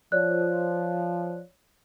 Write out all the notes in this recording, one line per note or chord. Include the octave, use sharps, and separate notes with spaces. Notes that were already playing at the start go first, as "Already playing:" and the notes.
F3 C#5 D5 F#6